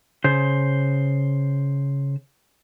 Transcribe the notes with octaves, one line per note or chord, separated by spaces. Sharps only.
C#3 C5